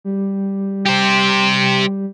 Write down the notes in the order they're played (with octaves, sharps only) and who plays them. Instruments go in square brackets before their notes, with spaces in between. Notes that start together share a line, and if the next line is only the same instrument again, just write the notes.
[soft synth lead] G3
[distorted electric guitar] G4 C5